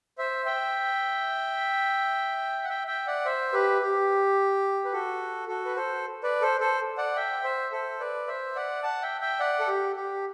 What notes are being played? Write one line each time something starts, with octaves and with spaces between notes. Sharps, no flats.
C5 E5
E5 G5
F#5
E5 G5
E5 G5
D5 F#5
C5 E5
G4 B4
G4
B4
F#4 A4
F#4 A4
B4
A4 C5
B4 D5
A4 C5
A4 C5
D5 F#5
E5 G5
C5 E5
A4 C5
B4 D5
C5 E5
D5 F#5
F#5 A5
E5 G5
E5 G5
D5 F#5
A4
G4
G4